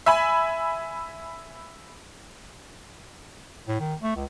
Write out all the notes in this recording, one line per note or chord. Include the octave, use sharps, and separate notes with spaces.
E5 G#5 B5
A2
D#3
A3
C#2